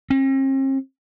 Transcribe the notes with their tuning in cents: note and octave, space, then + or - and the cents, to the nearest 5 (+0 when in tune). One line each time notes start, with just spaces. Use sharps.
C4 +45